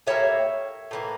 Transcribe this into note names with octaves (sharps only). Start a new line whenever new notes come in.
A2 G3 A#3 C#5 E5
A2 E3 A#3